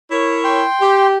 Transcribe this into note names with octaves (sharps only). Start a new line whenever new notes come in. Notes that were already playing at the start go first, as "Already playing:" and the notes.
E4 A#4 C#5
G5 C6
G4